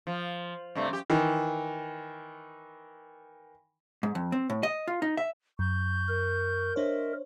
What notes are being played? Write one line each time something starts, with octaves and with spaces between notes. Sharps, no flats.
F3
G2 C3 A3
F#2 G4
D#3 E3
G#2
F2
C4
A2
D#5
F4
D#4
E5
F#2 C#6 G6
A#4
D4 C5 C#5 D#5 E5